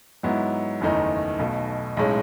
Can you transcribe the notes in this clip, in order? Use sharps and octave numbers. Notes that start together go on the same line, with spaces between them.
G#2 F#3 B3 E4
F#1 E2 D#3 A3 D#4
B1 B2 A3
B1 A2 G#3 C#4